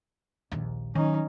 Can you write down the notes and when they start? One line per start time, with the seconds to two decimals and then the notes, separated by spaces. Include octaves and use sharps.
0.52 A#1 D#2
0.95 D#3 F#3 C#4 D#4